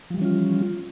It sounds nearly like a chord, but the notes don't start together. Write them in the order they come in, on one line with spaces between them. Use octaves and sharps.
F3 G3 E3 C#4 F4